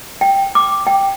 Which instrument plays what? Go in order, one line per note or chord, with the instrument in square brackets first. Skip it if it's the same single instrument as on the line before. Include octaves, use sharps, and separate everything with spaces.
[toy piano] G5
D6
G5